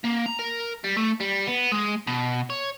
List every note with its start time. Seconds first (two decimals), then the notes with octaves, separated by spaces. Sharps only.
0.05 A#3
0.26 A#5
0.39 A#4
0.84 G3
0.96 A3
1.20 G3
1.47 B3
1.72 G#3
2.07 B2
2.50 C#5